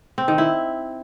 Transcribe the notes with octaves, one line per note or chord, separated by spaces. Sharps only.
C4
D#3
E4